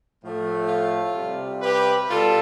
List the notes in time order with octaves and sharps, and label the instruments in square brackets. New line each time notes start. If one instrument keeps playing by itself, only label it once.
[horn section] A2 F3 A3
F4 A4
C3 G3
G4 B4
B2 G3 F4 A4